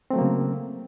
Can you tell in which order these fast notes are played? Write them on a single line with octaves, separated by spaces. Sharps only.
C4 A3 F#3 A#3 C#3